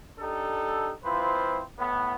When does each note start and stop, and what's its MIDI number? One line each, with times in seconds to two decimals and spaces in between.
0.19 0.92 62
0.19 0.92 63
0.19 0.92 67
0.19 0.92 69
1.04 1.61 53
1.04 1.61 60
1.04 1.61 64
1.04 1.61 65
1.04 1.61 71
1.04 1.61 72
1.78 2.16 45
1.78 2.16 59